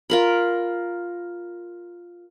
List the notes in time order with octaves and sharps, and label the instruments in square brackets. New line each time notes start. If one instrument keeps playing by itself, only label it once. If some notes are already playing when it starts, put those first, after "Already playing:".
[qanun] F4 A#4 B5